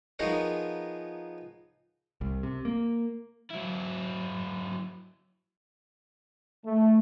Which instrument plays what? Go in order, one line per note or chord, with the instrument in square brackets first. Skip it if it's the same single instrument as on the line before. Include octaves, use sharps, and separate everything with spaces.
[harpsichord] F3 B3 D#4 G#4 A#4 C#5
[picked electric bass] C2
C3
A#3
[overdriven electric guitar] F#3 E4
[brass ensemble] A3